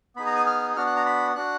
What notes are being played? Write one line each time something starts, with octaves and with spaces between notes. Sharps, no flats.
B3 D#4 G#4 B5
A#5
G#5
F6
B3 D4 F#4 F6
F#6
A#5
B5
D4 F#4 F#6